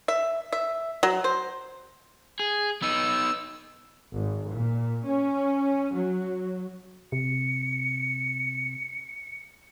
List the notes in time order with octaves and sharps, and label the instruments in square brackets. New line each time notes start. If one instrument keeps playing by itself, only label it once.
[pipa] E5
E5
F#3
C5
[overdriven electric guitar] G#4
[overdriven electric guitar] B3 D#4 [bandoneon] E6
[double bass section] G#1
A#2
C#4
F#3
[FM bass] C3 [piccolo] C#7